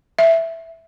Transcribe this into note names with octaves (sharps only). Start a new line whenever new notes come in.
E5